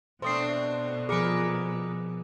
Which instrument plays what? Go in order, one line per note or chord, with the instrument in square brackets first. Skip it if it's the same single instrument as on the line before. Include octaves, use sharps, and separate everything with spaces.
[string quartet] B2 [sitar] A3 C4 D4 [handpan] C5 [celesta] C6 D#6 C7
[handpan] F3 G#4 [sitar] A#4 B4 [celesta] D6 C#7 D7